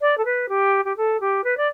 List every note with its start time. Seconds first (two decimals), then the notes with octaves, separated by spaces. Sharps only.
0.01 D5
0.17 A4
0.25 B4
0.48 G4
0.85 G4
0.97 A4
1.20 G4
1.44 B4
1.57 D5